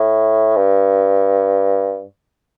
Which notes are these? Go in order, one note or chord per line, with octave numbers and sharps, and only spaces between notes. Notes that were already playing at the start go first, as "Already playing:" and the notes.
Already playing: A2
G2